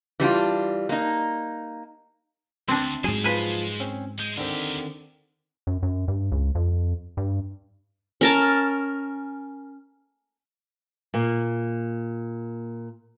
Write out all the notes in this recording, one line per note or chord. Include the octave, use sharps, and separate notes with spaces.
E3 G3 D4 F4
A#3 D#4
D2 C4 D4
G#2 F#3 G#3 G#4 C5
F3 F4 B4 G#5
C4 C#4
G#3 G6
D3 D#3 C4 G4 A#4
F#2
F#2
G2
C#2
F2
G2
C#4 A#4 A5
A#2 A#3